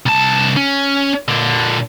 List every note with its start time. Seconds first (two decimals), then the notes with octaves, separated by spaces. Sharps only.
0.06 C2 A5
0.57 C#4
1.28 A#2 D3